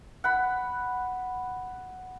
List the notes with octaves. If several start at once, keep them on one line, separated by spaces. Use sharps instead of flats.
F#5 B5